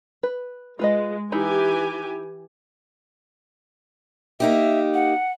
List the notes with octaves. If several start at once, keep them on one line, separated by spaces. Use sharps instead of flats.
B4
G#3 F4 B4 D#5
E3 D#4 E4 G4 G#5
A#3 D#4 G4 E5
F#5